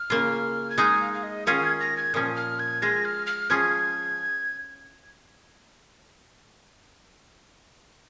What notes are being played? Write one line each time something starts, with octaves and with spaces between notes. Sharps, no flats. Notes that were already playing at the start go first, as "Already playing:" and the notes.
Already playing: F6
C#3 A#3 F4
G#6
G#3 D#4 G#4 F6
F5
F5
D#5
D#3 C#4 F4 G#4 F5
G#6
A#6
G#6
A#2 F3 C#4 D#6
F6
G#6
G#3 F4 G#4 A#6
F6
F6
F3 C#4 F4 G#4 G#6